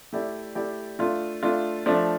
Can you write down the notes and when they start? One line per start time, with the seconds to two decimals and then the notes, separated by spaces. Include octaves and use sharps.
0.13 A3 E4 G4 D5
0.55 A3 E4 G4 D5
0.99 A3 D4 F4
1.43 A3 D4 F4
1.86 F3 A3 D4